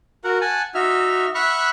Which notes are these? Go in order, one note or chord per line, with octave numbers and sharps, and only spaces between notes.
F#4 A#4 F#5
F#5 G#5 A5
D#4 F#4 E5 F6
E5 F#5 B5 C#6 F6 F#6